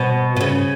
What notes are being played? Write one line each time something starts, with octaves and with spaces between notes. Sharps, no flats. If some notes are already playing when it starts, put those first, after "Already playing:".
Already playing: B2
B2
C#3